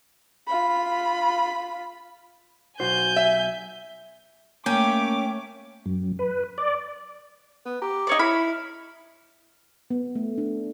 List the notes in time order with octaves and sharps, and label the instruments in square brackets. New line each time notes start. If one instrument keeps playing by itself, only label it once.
[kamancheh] F4 B5
[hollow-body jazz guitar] B1 F#4 C5 [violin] G#5 G6
[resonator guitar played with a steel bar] E5
[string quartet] A3 D6 [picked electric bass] A#3 [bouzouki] C#4 [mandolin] G5
[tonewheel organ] F#2
B4
D5
[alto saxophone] B3
[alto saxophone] G4 [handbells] A#5 D6
[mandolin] D#4 C#5 D5
[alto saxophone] E4 [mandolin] B5 [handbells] F6
[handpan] B3
A3
D4